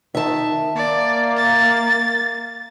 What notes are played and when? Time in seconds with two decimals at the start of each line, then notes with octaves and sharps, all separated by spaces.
0.15 D#3 E5 A5
0.76 A#3 D5
1.36 A6